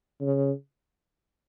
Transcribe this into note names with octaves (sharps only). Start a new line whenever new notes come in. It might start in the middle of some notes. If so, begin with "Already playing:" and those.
C#3